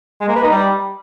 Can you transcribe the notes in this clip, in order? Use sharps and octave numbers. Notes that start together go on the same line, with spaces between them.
G#3
A#3
B4
D#4
G3